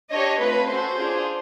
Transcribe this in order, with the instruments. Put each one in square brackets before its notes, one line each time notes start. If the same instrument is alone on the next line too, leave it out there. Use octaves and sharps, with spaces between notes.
[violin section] D4 G4 C#5 D#5
A3 C4 F4 B4
C#4 F#4 A4 C5
D4 F4 G#4